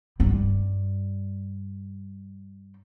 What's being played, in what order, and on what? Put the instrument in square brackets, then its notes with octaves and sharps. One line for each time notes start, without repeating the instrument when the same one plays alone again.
[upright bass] G2 G3